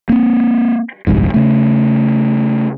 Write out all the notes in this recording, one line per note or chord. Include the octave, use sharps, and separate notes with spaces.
A#3 C4
G1 C2 F2 G#2
C#3 A3